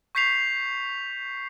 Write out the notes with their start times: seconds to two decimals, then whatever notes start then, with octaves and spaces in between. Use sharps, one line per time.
0.15 C#6 G6 B6 C7 F7